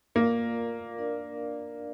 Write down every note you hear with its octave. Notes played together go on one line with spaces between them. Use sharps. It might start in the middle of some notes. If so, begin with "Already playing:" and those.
A#3 F4 A#4 D5 F5
D4 A#4 D5 F5